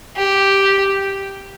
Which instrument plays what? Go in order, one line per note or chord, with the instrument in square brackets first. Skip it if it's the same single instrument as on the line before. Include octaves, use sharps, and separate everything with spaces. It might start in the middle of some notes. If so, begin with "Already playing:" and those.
[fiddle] G4